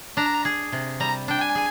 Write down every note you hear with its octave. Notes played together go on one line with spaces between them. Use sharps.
D4 A#5
G#4
C3
G3 A#5
D4 G5
G#5
G#4